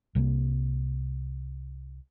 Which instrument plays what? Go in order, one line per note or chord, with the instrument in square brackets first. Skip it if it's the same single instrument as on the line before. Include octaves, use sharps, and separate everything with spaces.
[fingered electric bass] C2 C3 F3 A#3